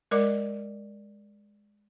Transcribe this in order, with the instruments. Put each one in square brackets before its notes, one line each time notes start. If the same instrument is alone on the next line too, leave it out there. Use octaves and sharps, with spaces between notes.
[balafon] G#3 A#4 D5 D#5 D6